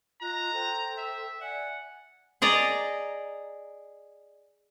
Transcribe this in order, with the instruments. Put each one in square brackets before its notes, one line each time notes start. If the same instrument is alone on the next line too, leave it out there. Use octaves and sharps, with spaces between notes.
[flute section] F4 D#5 F#6 [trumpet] A#5
[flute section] A4 C5 G5
[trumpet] E5
[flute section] D5 E5 G#5 [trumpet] F#5
[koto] G#4 D5 D#5 A#5